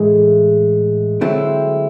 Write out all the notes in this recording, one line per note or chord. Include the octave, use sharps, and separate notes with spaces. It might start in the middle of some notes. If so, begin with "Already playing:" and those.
Already playing: A2 E3 G#3 A3
D3 F#3 A3 C4 E4